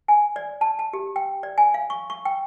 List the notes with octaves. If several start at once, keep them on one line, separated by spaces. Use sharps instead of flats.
G#5
D5
A5
A5
G4
G5
D5
G#5
F5
C#6
C#6
G5